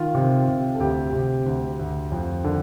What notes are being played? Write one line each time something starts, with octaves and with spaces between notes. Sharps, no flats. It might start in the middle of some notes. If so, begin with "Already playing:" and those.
Already playing: D#3 F4
C3
C3
A4
D2 G4
C3
D2
D2
F2
D3